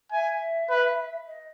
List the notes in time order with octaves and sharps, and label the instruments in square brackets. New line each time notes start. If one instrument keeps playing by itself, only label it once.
[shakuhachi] E5 [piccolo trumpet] G#5
[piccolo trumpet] B4
[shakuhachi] D#5